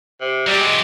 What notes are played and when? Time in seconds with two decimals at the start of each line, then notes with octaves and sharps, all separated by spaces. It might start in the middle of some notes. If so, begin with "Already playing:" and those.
0.21 C3
0.47 F#3 G3 G4
0.60 G#3